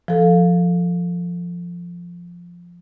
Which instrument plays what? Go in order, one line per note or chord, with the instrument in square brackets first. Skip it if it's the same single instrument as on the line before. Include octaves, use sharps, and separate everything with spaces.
[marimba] F3 A4